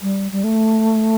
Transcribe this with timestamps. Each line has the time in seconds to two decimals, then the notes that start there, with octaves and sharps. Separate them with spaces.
0.02 G3
0.32 G3
0.44 A3